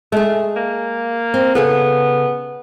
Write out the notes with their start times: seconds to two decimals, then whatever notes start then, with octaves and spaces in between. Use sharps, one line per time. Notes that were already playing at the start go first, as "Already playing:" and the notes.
0.12 G#3 A3 G#4
0.56 A#3
1.34 C4
1.55 C#3 B3 G#4 A4